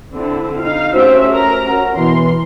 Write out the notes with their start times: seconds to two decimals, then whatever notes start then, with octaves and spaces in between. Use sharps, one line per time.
0.13 D3 C4 E4
0.59 D#4 F5
0.94 A3 C#4 F#4 G4 C5 E5
1.30 A#4 A#5
1.66 C#4 F#4
1.96 B2 E3 C6